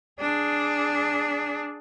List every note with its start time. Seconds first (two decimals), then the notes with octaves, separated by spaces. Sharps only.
0.20 D4 G#4